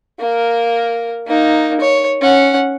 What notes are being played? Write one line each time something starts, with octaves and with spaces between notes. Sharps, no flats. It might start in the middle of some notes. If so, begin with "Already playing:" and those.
A#3 A#4
A#3 D#4
C#5
C#4 F#5